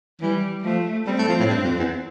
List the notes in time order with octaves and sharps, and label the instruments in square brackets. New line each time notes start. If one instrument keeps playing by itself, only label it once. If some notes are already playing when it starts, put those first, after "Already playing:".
[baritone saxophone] E3 [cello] G3
[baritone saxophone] F3 [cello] A3
[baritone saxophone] G3 [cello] C4
[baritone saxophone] A3
F3
A2
G2
F2
E2